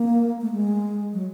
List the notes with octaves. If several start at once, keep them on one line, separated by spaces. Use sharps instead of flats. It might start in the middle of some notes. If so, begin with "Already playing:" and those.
Already playing: A#3
A3
G#3
F#3